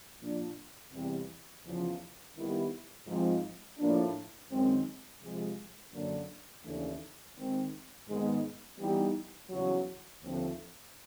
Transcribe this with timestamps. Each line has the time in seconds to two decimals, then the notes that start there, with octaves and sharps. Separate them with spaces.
0.21 A#2 F3 A#3 D4
0.92 E2 C3 E3 G3 C4
1.64 E2 C#3 F3
2.35 D#3 G3 B3 E4 G4
3.06 G#2 F3 G#3 C4 D#4
3.78 A2 F3 A#3 D4
4.49 F#2 D#3 G#3 C4
5.22 C3 F3 G#3
5.93 F#2 D3 F#3 A#3 D4
6.64 D#2 C#3 E3 A3 D4
7.35 D#3 G#3 C4
8.07 G#2 D#3 G#3 B3
8.79 E3 G3 B3 D#4 G4
9.50 E2 C#3 F#3
10.21 D#2 D3 F3 A3 C4